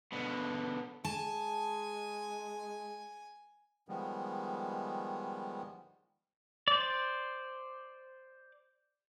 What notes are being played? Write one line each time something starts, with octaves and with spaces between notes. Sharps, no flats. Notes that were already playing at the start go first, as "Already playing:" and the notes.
B2 D3
G#3 G#5 A5
D#3 F3 G3 G#3 B3
C5 D5